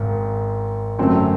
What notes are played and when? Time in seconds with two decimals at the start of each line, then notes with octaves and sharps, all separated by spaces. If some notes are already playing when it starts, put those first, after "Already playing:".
Already playing: G#1 G#2
0.99 F#2 D3 F#3 A3 C4